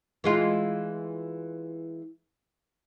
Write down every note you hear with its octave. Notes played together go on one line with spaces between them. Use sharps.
E3 G#3 F4